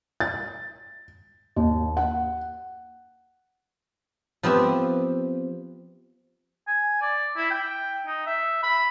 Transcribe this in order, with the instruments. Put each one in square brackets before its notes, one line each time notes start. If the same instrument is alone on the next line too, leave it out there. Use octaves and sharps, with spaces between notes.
[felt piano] A6
D#2
F#5
[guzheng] F3 B3 C4 G4 E5
[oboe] G#5
D5
E4
G5
D#4
E5
B5